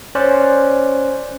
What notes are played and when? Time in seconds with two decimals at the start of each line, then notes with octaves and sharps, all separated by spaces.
0.15 C#4 C5 D5 F#6